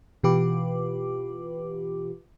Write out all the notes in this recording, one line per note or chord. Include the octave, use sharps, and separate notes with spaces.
B2 E3 F4 G4 B4 D6